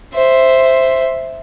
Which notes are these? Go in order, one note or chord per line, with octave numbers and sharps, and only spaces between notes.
C5 E5